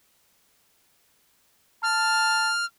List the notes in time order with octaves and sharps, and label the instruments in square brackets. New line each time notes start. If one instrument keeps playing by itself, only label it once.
[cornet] A5 [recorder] F6